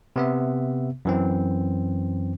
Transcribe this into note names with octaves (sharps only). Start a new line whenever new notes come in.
C3 B3 E5
F#2 E3 C4